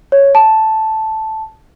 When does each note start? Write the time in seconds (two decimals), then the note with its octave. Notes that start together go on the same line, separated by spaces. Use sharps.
0.12 C#5
0.35 A5